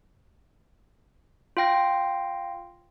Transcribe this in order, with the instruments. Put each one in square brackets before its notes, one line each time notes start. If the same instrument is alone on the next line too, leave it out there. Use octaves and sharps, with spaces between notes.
[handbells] F4 F5 G5 A#6